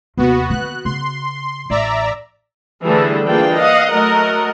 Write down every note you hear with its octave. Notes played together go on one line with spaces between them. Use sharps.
D#2 C3 B3 F#4
D3 A#3 F#6
C#3 C6
A1 D5 E5 A#5
D3 E3 G3 A3 G#4 A4
E3 A#3 D4 F4 G#4 G5
D#5 F5 F#5
F#3 A3 A#4 D#5 F#5